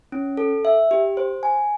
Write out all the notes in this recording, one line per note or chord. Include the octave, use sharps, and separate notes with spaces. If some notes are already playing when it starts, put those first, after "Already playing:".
C#4
A4
E5
G4
C5
G#5